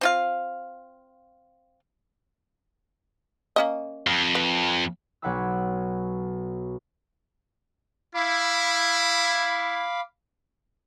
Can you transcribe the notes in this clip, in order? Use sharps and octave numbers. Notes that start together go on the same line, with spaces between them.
C4 F4 F5
A#3 C#4 D#5
F2
B4
B1 C#5 F#5 B5 D6 E6
E4 F5 B5 D6